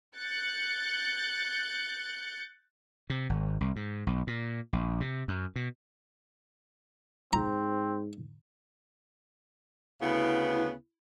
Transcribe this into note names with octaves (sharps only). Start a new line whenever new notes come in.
F#6 G6 A6 C#7
C3
G#1
C2
G#2
B1
A#2
A#1
C3
F#2
B2
G#2 C4 A#5
D2 C#3 B3 E4